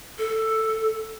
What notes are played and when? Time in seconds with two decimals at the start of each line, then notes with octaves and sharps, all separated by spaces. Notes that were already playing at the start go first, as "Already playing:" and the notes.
0.19 A4